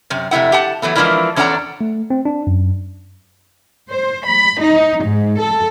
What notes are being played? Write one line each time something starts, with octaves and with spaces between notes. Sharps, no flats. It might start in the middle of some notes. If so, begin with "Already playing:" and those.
F#2 C3
F2 C3 A3 E4 F#5
G4 F#5 A5
E3 F#3 A3 B3
E3 F3 G#3 D4 E4 A#4
E2 C#4 D4 A4 F#5 A#5
A3
C4
D4
F#2
C5
B5
D#4
G#2
A4